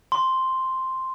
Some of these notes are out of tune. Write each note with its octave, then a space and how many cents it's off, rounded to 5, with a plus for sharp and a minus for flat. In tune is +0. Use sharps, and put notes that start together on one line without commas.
C6 +0